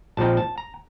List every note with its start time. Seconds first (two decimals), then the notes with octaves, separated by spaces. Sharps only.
0.17 A#1 A#2 F3 C4 D#4 A5
0.37 A5
0.58 A#5